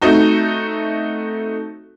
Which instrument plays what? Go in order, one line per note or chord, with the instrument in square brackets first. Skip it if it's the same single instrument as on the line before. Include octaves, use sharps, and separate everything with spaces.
[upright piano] A3 C4 D#4 F#4